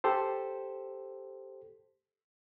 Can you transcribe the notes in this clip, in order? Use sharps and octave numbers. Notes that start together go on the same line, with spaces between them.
G4 A4 C5